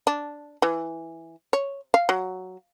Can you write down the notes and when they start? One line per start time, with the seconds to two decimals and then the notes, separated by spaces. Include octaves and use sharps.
0.07 D4
0.62 E3
1.53 C#5
1.94 F5
2.09 F#3